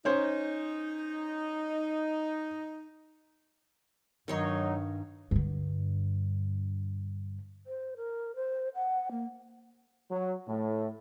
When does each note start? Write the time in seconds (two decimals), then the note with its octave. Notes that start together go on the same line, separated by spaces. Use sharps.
0.05 C#4 D#4 C5
4.28 G2 D#3 F#3 D#4 C#5 C6
5.31 G2 D3
7.65 C5
7.97 A#4
8.36 C5
8.75 F#5
9.11 A#3
10.11 F#3
10.47 A2